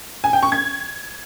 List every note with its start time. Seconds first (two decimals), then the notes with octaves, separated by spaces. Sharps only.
0.24 G#5
0.33 G5
0.43 C#6
0.52 G#6